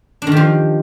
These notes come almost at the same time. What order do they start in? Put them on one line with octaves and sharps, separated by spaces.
D4 D#3 G4 F3